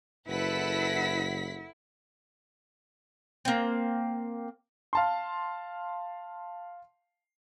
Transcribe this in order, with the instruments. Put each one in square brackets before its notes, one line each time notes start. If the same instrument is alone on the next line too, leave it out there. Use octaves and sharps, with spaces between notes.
[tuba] F#1 [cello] E4 [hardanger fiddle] A4 B4 [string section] F#5 B6
[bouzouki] A#3 C4
[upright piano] F5 A5 C6